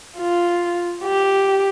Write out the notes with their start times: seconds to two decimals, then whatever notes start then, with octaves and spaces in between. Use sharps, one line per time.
0.18 F4
1.04 G4